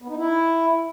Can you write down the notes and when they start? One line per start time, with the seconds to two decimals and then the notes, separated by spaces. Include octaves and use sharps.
0.02 B3
0.10 D#4
0.17 E4